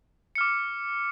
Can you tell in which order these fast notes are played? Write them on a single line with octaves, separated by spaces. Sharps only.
C#7 F6 D6